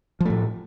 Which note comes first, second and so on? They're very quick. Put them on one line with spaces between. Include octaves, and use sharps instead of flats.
F3 A3 A2